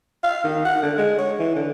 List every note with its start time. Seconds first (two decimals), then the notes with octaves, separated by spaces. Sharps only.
0.24 F5
0.44 D#3
0.65 F#5
0.82 D3
0.97 G#3
1.18 C#5
1.39 E3
1.56 D3